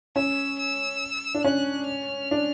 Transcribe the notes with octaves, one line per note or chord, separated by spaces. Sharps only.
C#4 E6
E6
D4
C#4 F#6
F6
D4